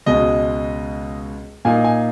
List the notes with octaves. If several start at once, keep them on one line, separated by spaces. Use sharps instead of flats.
C#2 B2 G#3 D#5
A#2 A#3 D#4 G#5
G#5